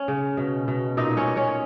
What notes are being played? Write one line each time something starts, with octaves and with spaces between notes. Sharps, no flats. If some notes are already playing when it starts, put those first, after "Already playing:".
Already playing: C#4 C#5
C#3
B2
B2
A#2 D#4 D#5
C#4 C#5
A#2
C#4 C#5